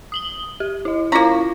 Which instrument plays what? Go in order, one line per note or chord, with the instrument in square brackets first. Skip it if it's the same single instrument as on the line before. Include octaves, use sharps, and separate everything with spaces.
[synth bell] D#6 F#7 G7
G4
E4 D#5
[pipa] A#3 A#5 [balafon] C#4 F4 [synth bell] E4 C#6